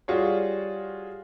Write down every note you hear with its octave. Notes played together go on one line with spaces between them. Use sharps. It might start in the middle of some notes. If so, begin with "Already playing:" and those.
G3 F4 F#4 G#4 C#5